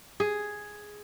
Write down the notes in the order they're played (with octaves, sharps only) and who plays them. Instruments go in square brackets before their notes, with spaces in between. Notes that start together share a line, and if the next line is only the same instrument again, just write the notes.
[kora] G#4